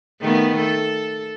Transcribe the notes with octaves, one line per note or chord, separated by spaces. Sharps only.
D#3 A3 B3
A4